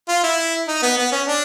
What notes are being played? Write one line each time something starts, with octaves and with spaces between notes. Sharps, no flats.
F4
E4
D#4
B3
B3
C#4
D4